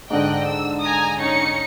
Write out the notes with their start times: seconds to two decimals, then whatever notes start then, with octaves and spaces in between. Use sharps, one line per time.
0.10 G#2 D3 D#5 G5 F#6
0.45 E6
0.81 G#5 A#5 D#6
1.19 C#4 D#4 C#7